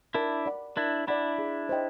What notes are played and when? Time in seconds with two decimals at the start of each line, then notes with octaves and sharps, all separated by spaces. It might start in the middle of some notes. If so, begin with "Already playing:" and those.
0.14 D4 E4 A#4
0.46 D5 F#5 B5
0.77 D4 E4 A#4
1.07 D4 E4 D5 F#5 B5
1.38 G#4
1.69 C5 D#5 G5